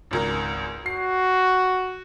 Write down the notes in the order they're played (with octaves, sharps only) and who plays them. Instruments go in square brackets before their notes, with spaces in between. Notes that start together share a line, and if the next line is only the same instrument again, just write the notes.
[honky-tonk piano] G#1 C#2 A#4
[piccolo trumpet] F#4 [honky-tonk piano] C7